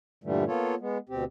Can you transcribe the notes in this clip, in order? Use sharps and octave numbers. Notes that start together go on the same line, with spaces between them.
G2 A#2 D3 E3 G3 A3
A#3 B3 F4 A4 C#5
G#3 B3
D2 B2 C4 G4